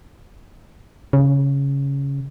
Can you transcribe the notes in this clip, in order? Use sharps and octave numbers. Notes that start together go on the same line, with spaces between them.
C#3